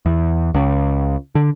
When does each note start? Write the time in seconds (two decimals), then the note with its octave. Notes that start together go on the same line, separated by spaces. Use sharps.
0.06 E2
0.54 C#2
1.35 D3